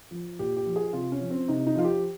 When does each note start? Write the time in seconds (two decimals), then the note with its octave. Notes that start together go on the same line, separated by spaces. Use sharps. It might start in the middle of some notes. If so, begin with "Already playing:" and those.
0.11 F3
0.39 A#2 G4
0.57 G4
0.66 F3
0.76 G#4
0.93 C3 F4
1.12 C#4
1.20 F3
1.31 C4
1.48 C3 D#4
1.67 D#4
1.75 F3 F4
1.85 G4